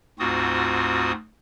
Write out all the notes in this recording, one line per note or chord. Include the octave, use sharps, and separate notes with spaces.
D2 G#2 C4 F4 F#4 D#6